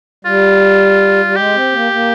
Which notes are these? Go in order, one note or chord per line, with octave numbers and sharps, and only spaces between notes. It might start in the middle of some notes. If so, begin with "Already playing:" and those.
G3 F4
G3
G#3 G4
C4
A#3
A#3